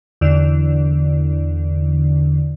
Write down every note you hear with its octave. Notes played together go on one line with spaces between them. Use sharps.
E2 D3